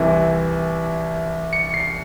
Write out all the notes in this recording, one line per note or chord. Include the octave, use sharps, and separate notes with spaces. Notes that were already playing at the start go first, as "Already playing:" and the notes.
Already playing: C2 C3 E3
C#7
C7